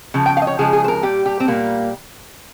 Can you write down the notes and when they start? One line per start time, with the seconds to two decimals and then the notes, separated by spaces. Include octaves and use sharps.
0.14 C#3 F3
0.26 G5
0.37 F5
0.42 D#5
0.47 C#5
0.59 C#3 F3 G#3 G#4
0.73 G#4
0.84 C5
0.88 A#4
1.03 A#2 G3 G4
1.26 G4
1.40 C4
1.48 A#2 G3 A#3